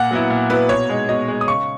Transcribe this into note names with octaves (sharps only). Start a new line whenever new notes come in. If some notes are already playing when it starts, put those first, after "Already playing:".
Already playing: A#2 F#5
F#3 B3 E4
A#2
F#3 B3 E4 B4
B2 C#5
G#3 D#4
B2 D#5
G#3 D#4
D#6
C#3 C#6